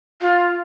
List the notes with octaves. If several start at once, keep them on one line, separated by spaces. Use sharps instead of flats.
F4